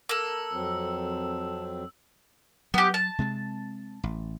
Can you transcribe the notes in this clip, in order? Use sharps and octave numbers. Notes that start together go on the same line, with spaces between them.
A#3 A4 E6
F2 F#3 C4
F#3 B3 G4
A5
C3 G#3 C4
A1